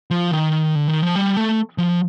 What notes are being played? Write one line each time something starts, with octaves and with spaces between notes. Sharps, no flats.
F3
D#3
D3
D#3
F3
G3
A3
F3